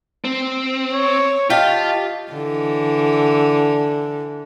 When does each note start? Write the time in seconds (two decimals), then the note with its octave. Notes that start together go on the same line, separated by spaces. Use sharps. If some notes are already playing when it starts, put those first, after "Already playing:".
0.24 C4
0.94 C#5
1.50 F4 G4 D#5 F5 A5 B6
2.32 D3 E3